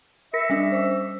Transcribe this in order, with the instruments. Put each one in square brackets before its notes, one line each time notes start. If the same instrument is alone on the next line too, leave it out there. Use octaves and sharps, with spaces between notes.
[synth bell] A#4 A#6 C#7 [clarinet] E5
[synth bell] G3 C#4 D4
C5